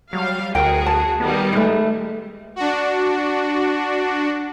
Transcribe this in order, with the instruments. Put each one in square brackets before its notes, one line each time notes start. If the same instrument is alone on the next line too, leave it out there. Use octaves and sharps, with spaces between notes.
[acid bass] F#3 [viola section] G3 F5
[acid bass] D2 [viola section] F#4 G#4 [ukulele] A#4 G5
[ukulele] A5
[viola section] D#3 G3 [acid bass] B3
[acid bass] G#3 [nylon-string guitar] A3 B4
[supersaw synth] D4 F#4